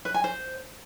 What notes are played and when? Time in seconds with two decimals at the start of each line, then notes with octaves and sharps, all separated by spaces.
0.05 B4
0.14 G#5
0.24 C5